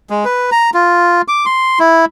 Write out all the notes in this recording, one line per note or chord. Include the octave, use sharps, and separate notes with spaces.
G#3
B4
A#5
F4
D6
C6
E4